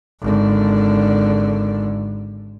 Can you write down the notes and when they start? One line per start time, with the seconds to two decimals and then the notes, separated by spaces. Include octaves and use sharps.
0.21 G#1 D3